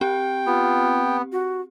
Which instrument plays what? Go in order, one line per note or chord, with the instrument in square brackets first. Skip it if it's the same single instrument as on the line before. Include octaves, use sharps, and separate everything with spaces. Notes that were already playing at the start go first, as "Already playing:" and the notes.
[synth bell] C4 G4 [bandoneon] G5
[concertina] B3 [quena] F4
[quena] F#4